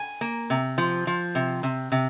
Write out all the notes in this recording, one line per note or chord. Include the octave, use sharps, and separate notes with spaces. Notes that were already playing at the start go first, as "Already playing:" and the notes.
Already playing: G#5
A#3
C3
F3
F3
C3
C3
C3